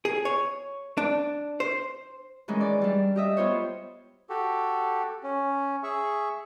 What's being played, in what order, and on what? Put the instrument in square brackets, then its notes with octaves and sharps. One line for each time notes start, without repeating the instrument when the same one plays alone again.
[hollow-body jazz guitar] G#4
C#5
D4
C5
[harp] D#3 E3 G#3 C#4
D5
G3 D4
G4 D#5 E5
B3 F4 C5 C#5
[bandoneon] F#4 G4 A4
C#4
G#4 E5 C#6